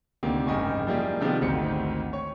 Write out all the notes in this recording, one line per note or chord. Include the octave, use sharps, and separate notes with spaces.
D2 C3 D#3 A#3 D4
F#1 G#2 G4 D#5 G#5 C#6
F3 G3 A#3 E4 G4 G#4
C3 D#3 F3 G3 G#3 B3
G#1 D2 D#3 C4 C#7
C#5 C#6